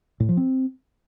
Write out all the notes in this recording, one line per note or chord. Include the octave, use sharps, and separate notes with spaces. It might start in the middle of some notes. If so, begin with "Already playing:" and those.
A2
F3
C4